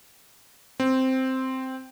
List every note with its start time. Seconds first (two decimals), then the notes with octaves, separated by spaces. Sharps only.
0.80 C4